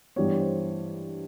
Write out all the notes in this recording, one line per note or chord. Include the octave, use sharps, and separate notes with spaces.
G2 E3 G3 B3 C#5
C5